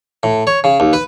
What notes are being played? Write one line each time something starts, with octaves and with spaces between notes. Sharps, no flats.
A2
C#5
C#3
D#2
B4